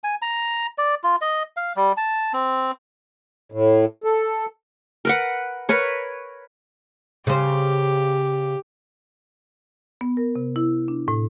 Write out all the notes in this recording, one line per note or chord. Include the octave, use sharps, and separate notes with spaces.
G#5
A#5
D5
F4
D#5
F5
G3
A5
C4
A2
A4
A#4 B4 F#5
A#4 B4 C#5
C#3 G4 C5
B3
A#4
C3
E4
D4
A2